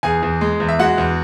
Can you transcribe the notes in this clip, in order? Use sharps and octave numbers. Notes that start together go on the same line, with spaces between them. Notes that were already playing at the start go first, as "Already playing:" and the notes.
E2 G#4 G#5
E2
G#3
E2
E5
G#3 F#4 F#5
E2